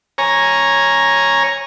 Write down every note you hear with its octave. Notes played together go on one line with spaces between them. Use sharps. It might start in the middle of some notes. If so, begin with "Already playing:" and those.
C#5 G#5 A#5